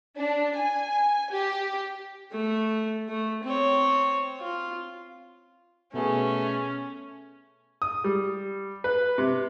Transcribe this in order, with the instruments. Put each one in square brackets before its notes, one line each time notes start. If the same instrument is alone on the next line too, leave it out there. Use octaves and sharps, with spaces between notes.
[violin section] D4
G#5
G4
[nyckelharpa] A3
A3
C4 C#5
F4
[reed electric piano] B2 B3 G#4 [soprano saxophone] A3 [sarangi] C#4
[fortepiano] D#6
G3
B4
C3